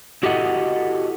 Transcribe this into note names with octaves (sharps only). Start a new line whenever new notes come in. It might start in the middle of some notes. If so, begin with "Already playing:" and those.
E4 F#4 G4 A4 D#5 F#5